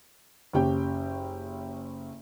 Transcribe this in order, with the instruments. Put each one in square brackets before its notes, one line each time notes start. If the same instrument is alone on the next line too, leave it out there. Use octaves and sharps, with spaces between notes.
[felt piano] F#1 C#4 G4 G5